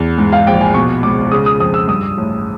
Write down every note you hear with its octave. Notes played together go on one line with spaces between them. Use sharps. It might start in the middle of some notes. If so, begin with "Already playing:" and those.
Already playing: E2
G#2
F5
A#1 G5
G#5
B2 C#6
C#2 D6
C#3 D#6
D#6
F2 D#6
E6
G2 D#6
A1